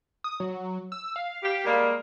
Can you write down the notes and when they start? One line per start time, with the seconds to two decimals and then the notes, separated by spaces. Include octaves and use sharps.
0.24 D#6
0.40 F#3
0.92 E6
1.16 F5
1.43 G4
1.64 G3 G#3 A#3